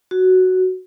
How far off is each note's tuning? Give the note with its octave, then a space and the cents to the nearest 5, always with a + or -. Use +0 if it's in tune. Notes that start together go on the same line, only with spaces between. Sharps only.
F#4 +5